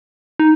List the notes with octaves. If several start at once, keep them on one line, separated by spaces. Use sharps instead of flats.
D#4